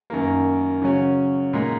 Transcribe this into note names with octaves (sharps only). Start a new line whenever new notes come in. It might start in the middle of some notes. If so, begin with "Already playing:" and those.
F#2 D#3 A#3
C#3 F#3 C#4
A#2 G#3 D#4